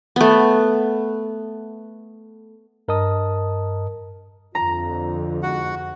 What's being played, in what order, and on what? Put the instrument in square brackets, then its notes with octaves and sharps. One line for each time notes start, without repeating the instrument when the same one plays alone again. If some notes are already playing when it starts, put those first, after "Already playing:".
[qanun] A3 B3
[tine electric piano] G2 A#4 D#5 A5 D#6
[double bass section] F2 D3 [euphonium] F4 [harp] A#5
[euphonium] G#2 [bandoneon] F#4 F#5